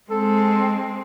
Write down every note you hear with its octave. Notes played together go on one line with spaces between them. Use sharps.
G#3 C4 A4